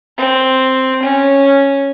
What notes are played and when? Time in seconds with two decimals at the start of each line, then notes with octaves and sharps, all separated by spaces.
0.17 C4
1.02 C#4